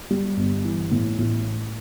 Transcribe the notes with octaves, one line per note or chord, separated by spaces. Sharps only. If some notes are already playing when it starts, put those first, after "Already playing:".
G3
G1
E3
A2
A1